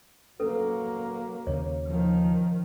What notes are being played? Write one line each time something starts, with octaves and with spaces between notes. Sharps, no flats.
F#3 A#3 C#4 A4 B4
D#2 C#3 C#5
D#3 F3